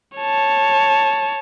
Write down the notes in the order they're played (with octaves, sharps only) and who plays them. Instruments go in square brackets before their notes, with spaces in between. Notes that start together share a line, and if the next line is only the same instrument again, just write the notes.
[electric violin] C#5 A5